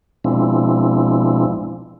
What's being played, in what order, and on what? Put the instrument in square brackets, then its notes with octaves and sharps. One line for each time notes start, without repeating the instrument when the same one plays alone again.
[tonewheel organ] B2 F3 G#3 C4 D4 E4